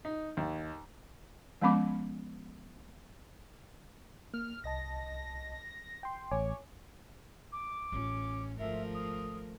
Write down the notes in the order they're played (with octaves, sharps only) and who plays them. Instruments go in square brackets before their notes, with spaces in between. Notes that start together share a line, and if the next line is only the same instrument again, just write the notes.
[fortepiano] D#4
D#2
[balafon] F3 G#3 B3 C#4 B5 D6
[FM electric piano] A#3 [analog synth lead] F6
[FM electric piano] C2 D#5 A5 [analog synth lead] A#6
[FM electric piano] G5 C6
[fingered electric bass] A1 [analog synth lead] C#5 [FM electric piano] G#5 D6
[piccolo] D6
[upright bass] A1 F4 [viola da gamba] C#4
[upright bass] G#1 [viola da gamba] F3 A3 A#4 [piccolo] E5
[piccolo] D#6